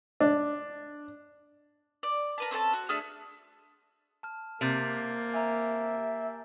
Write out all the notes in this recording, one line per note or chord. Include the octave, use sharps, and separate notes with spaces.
D4
D5
A#4 B4 A5
C4 C#4 A4 A5
F#4
A3 D4 G#4 F6
A5 F6
C3 A#3 G6 A6 D7
E5 G#5 A#5